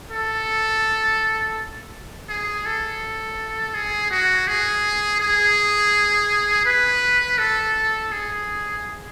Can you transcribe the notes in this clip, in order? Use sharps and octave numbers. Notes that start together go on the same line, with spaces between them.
A4
G#4
A4
G#4
F#4
G#4
G#4
B4
A4
G#4